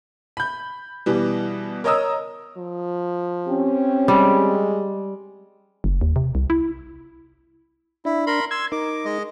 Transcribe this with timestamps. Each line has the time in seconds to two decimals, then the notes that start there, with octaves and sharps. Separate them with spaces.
0.37 B5 G6
1.06 B2 E3 G3
1.84 A#4 C#5 D#5 A#5 D#6 E6
2.57 F3
3.48 C4 C#4 G4
4.08 G3 G#3
5.84 F#1
6.01 D#2
6.16 C3
6.35 C2
6.50 E4
8.05 D4 E4
8.27 A#4 B5 C6
8.51 C6 E6 G#6
8.72 D#4 A#4 D6
9.05 G#3 D#5